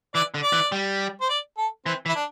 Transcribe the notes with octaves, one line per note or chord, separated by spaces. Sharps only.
E3 D5
D3
D5
E3
G3
C5
D5
A4
E3 C4
E3
E4
D4